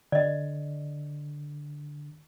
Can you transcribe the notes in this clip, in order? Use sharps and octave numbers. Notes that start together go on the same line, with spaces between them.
D3 D5 D#5